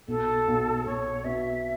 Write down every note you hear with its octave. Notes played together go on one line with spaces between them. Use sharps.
B1 A4
B1
B1 C#5
B2 E5